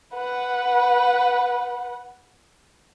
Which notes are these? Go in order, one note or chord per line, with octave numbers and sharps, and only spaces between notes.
B4 F#5